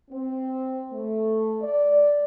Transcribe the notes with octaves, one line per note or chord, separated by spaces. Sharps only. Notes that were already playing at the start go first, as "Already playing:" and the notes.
C4
A3
D5